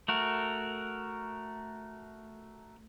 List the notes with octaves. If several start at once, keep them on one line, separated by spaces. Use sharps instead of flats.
A3 F#4 A#4